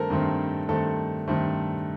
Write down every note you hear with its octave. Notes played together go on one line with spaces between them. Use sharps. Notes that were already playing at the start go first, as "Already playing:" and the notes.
Already playing: G2 D#3 A3 C4 A4 A#4 C5
G2 D#3 A3 C4
G2 D#3 A3 C4 A4
G2 D#3 A3 C4